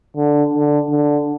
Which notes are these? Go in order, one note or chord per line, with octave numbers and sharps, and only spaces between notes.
D3
D3
D3